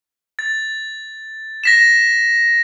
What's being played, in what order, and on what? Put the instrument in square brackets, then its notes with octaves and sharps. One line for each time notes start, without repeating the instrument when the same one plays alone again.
[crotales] A6
A#6 B6 E7